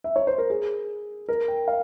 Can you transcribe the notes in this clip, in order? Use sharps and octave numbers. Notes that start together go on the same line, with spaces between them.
E5
C#5
C5
A#4
G#4
A#4
G5
F5